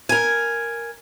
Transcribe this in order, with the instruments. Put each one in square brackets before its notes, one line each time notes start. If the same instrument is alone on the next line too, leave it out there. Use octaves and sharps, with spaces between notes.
[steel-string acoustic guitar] A#4 G#5